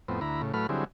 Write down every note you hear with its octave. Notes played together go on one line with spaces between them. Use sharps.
F2 A2 B3 C4
D2 E4 A#5 B5
A2 C#3
A2 F#3 A3 B4 B5 F6
D3 F#3 G3 C4 E4 G#4